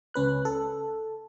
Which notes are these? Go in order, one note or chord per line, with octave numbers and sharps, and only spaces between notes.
C#2 C#4 B4 F#6
A4